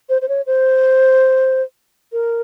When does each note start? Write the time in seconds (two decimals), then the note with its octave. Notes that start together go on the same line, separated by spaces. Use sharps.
0.09 C5
0.22 C5
0.28 C#5
0.46 C5
2.12 A#4